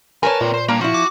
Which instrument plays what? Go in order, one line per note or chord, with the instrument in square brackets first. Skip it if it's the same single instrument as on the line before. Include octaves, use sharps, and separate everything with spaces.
[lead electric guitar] F2 A5 [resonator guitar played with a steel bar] A#4 B4 C#5 [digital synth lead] G#5
[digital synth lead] A#2 [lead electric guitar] A#3 C4
[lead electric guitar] C5
[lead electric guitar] G3 D4 [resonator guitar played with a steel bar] A#3 A#5
[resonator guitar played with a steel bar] F3 E4 [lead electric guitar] F#4
[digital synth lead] D6